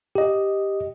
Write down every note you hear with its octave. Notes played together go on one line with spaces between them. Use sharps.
G4 D#5